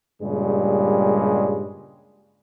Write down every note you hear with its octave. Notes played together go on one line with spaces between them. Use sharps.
G2 A#2 C#3 G3 G#3